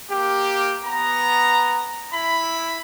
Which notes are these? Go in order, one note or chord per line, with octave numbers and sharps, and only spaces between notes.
A#3 G4
B3 A#5
E4 B5